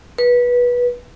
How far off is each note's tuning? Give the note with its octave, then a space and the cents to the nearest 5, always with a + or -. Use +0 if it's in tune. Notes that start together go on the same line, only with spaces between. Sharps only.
B4 -20